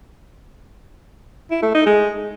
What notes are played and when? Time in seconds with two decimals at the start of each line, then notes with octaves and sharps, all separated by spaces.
1.51 E4
1.62 A3
1.74 D#4
1.86 G#3